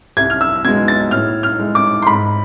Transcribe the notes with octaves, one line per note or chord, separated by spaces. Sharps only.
C2 G#6
F6
E6
B2 G#3 G#6
A6
A2 F6
F6
G#3
D6
C6
G#2 B5